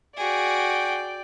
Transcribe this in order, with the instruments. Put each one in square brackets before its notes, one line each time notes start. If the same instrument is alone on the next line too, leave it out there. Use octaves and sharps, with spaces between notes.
[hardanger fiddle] F#4 G#4 [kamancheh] D5 G5